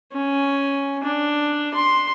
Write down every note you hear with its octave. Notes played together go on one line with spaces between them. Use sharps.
C#4
D4
C6